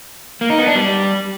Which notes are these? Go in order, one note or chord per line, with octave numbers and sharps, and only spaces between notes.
A#3
D#4
B3
D4
G3